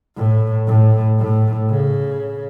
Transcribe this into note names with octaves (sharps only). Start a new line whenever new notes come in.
A2
A2
A2
C#3